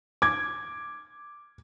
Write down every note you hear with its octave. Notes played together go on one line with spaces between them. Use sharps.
D6 G#6